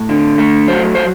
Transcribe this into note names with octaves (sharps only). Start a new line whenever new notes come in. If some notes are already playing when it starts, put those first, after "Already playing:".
Already playing: A2
D3
A3
F#3 C5
C5